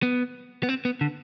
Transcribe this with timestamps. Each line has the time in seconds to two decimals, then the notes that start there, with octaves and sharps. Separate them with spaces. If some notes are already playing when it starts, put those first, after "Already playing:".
0.03 B3
0.63 B3
0.69 C4
0.85 B3
1.01 D3